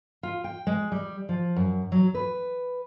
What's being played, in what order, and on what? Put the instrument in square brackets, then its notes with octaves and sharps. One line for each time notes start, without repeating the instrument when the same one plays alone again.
[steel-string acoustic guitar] F4
G5
G#3
G3
F3
F#2
F#3
B4